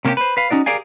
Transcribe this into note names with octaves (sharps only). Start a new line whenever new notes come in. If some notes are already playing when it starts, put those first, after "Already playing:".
C3 A#3 C#4 F#4 G4
B4 C5
B4 F5
C#4 D#4 F#4 D5
G4 G#4 A#4 D5 F5 G#5